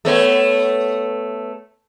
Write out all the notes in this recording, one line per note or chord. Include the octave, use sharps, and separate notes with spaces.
A3 B3 C#5